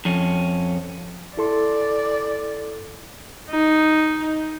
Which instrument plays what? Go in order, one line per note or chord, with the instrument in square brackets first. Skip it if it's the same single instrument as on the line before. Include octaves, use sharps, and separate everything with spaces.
[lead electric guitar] F2 C#4
[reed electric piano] E4 A4 C6 [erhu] D5
[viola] D#4